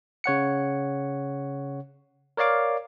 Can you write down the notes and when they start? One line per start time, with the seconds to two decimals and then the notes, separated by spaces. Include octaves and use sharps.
0.24 C#3 C#5 F#5 C#7
2.37 A#4 C#5 D5 F5 D6